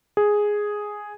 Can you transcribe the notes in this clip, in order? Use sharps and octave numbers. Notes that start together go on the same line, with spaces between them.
G#4